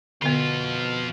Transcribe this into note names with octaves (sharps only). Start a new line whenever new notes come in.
F2 B2 D3 B3 F4